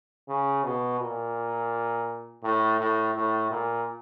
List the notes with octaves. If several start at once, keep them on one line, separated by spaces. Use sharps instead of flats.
C#3
B2
A#2
A2
A2
A2
A#2